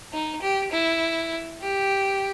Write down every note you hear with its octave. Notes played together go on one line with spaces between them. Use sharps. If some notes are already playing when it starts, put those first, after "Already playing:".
D#4
G4
E4
G4